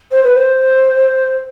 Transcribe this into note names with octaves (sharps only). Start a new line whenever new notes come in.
C5
B4
C5